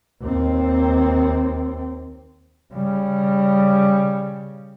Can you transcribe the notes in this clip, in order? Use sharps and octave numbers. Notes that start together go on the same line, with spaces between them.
D#2 C4
C#3 G3